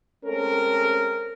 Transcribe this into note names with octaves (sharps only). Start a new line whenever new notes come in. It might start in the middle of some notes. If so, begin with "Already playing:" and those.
G#3 A3 C4 C#4 A4 A#4